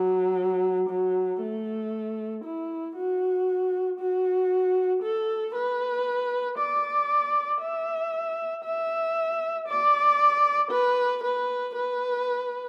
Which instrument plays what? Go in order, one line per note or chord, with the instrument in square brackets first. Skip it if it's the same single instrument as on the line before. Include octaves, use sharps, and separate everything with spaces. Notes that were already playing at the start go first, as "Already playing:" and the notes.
Already playing: [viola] F#3
F#3
A3
E4
F#4
F#4
A4
B4
D5
E5
E5
D5
B4
B4
B4